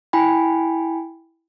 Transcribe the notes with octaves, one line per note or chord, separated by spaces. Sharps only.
E4 G5 G#5 B5